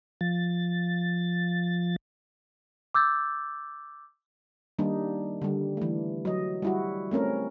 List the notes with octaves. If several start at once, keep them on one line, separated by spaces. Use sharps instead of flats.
F3 A6
D6 E6 G6 A6
D#3 G3 A#3 D4 D#4
D3 G3
E3 A3
F#3 D#5
G3 E4 F#4
A3 C4 C#4 A#4